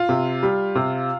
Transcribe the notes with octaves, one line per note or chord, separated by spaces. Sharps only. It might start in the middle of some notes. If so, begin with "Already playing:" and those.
Already playing: F4
C3
G3
C3